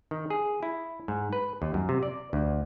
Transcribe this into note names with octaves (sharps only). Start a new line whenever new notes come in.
D#3
G#4
E4
G#2
B4
D#2
F#2
C3
D5
D2